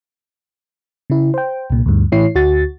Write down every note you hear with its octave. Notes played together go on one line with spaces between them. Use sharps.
C#3 E4
C5 G5
C2 A#2
D2 G2
A2 E3 E4 C#5 C7
D2 F#4 A6